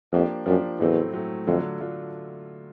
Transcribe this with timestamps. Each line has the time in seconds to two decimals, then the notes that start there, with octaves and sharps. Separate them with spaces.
0.12 F2 F3 A#3 D4 G4
0.46 F#2 F3 A#3 D4 G4
0.80 E2 A2 F#3 A3 C4
1.13 A2 F#3 A3 C4
1.47 F2 D3 F#3 A3 D4 F4
1.80 D3 F#3 A3 D4 F4